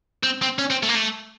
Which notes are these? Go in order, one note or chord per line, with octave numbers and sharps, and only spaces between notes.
C4
C4
C#4
C4
A3
A#3
A3